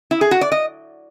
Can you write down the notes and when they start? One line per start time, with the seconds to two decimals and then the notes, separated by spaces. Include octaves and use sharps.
0.11 E4
0.21 G#4
0.31 F#4
0.41 D5
0.52 D#5